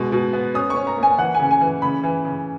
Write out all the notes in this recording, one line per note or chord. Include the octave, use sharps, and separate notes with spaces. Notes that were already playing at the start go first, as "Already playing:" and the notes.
Already playing: B2 G#3
B2
B3
C#4 D#6
C#6
C#4
A#5
A#3
G#5
E3 F#5
C#3 G#5
G#5
E3
C#3 B5
E3
C#3